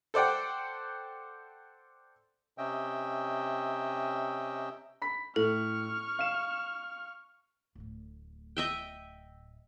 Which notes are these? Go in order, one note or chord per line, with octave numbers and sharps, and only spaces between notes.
A4 C5 D5 F#5 G5
C3 C#4 D#5 E5 G5
B5 B6
A2 A4 C#6 F6
F5 E7
D1 A2
D#5 E5 G5